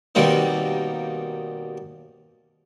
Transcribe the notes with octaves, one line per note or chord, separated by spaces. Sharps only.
D#2 B2 D#3 G3 A#3 C4